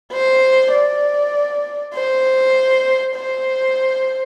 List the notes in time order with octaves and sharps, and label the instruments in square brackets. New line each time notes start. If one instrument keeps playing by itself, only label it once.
[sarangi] C5
D5
C5
C5